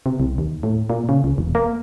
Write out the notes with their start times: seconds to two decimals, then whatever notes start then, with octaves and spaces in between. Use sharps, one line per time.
0.06 C3
0.20 C2
0.38 D#2
0.63 A2
0.90 A#2
1.09 C#3
1.24 C#2
1.38 E1
1.55 A#3